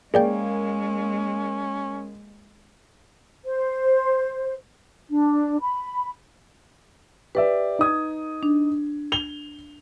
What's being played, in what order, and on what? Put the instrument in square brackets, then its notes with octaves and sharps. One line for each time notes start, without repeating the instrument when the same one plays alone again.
[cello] G#3 [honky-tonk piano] A#3 [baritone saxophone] C#4 [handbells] G#4 D5 G5
[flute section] C5
D4
B5
[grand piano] G4 D5 E5 [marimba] B4
[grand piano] D#4 D#6 G#6
[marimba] D4
[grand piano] F7 G7